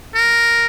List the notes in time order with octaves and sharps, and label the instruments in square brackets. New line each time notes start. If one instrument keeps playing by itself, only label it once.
[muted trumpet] A#4